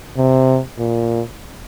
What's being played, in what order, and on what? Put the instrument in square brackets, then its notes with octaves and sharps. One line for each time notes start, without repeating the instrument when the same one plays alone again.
[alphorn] C3
A#2